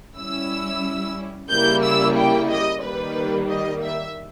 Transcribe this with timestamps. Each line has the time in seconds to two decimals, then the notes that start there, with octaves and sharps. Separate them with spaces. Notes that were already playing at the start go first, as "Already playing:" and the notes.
0.17 G3 C#4 E4 E6
1.50 C#3 G3 A#3 E4 G6
1.84 E6
2.17 G5
2.50 D#5
2.83 D#3 G3 A#3 B4
3.49 D#5
3.83 E5